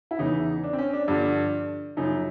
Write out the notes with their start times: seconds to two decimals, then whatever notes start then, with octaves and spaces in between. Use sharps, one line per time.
0.11 E4
0.19 E2 C#3 E3 D#4
0.63 D4
0.73 C4
0.78 C#4
0.93 D4
1.08 G2 D3 F3 D4
1.97 F#2 C#3 F3 D#4